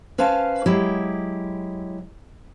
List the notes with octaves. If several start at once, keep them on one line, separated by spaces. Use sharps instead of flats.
C#4 B4 C5 F5 A5
F#3 G#3 E4 G4